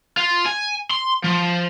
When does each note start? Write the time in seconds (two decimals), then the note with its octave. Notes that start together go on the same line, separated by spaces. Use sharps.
0.17 F4
0.46 G#5
0.91 C6
1.24 F3